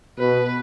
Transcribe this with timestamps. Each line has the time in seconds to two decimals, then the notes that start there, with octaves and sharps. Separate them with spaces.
0.19 B2 B4